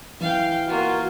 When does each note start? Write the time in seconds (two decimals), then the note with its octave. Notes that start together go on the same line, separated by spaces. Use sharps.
0.20 E3 F5 G5
0.68 A#3 F4 F#4